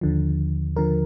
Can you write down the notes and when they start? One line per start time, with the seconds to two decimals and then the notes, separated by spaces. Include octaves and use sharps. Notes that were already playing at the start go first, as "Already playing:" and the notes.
0.01 D#2 D3 F3
0.76 D#2 D3 F3 A#4